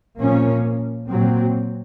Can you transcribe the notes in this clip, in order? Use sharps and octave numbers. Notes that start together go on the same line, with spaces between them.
A#2 F3 A#3 C#4
A#2 F#3 C4